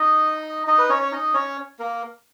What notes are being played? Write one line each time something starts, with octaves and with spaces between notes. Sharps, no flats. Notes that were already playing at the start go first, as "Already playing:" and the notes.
Already playing: D#4 D#5
D#4 D#5
B4
C#4 C#5
C#5
D#4 D#5
C#4 C#5
A#3 A#4